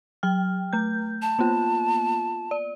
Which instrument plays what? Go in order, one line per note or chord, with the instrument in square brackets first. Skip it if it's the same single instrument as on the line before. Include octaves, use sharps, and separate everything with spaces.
[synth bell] F#3 G5 F6
A3 G6
[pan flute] A5
[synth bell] A#3 B3 F4
D5